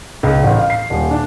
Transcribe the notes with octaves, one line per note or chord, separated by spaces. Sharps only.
C#2
A1
F5
C7
D#1
D4